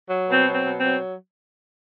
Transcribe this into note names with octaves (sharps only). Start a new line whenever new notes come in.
F#3
B2 C4
F#3
C4
B2
C4
F#3